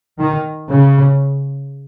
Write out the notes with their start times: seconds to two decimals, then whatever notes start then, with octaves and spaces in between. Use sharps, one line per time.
0.19 D#3
0.71 C#3